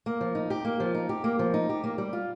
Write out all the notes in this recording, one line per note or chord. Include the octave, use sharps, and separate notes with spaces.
A#3
F3
D#4
G4
A#3
F3
D#4
G4
A#3
F3
D#4
G4
A#3
G3
F4